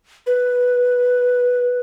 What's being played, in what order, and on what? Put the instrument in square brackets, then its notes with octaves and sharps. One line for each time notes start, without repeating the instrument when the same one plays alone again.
[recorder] B4